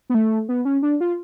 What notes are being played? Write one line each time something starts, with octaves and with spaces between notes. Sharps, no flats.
B3
A3
B3
C#4
D4
F4